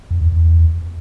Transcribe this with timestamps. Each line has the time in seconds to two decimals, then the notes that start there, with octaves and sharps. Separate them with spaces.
0.11 F2
0.21 E2
0.32 E2